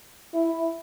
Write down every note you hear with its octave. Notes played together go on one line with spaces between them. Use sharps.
E4